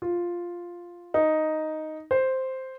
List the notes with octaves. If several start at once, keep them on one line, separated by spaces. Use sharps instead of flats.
F4
D#4
C5